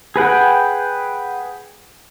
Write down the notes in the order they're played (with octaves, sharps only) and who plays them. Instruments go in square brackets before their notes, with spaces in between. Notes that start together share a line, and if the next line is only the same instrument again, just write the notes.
[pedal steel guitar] G#4 B4 F#5 G5